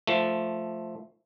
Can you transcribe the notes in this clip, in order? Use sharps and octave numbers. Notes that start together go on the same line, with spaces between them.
F3 A3